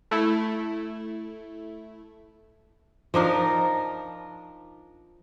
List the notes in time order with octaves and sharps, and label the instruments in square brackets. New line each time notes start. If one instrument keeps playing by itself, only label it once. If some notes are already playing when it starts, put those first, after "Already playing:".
[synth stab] A3 E4
[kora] F3 D4 D#4 A#4